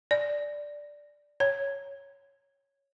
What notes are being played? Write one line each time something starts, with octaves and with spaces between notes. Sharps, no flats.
D5
C#5